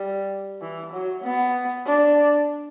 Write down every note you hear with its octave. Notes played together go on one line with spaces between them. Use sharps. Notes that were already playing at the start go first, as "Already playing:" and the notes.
Already playing: G3
E3
F#3
B3
D4